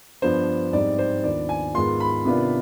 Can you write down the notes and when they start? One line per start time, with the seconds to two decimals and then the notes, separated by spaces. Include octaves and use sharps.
0.22 G2 F3 B3 D4 C5
0.73 G#2 G3 C4 D#4 D5
0.99 C5
1.24 D#2 D#3 B3 D4 F4 D5
1.49 G#5
1.74 G#2 D#3 G#3 B3 F4 C6
2.00 B5
2.25 C3 D#3 B3 D4 F4